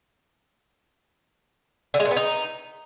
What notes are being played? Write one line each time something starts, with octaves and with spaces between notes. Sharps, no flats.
D3
G#3
A#2
B3
D#4